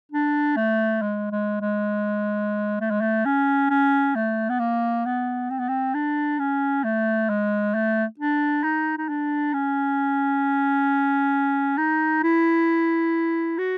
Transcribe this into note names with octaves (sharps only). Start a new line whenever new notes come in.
D4
A3
G#3
G#3
G#3
A3
G#3
A3
C#4
C#4
A3
B3
A#3
B3
C4
B3
C4
D4
C#4
A3
G#3
A3
D4
D#4
D#4
D4
C#4
D#4
E4
F#4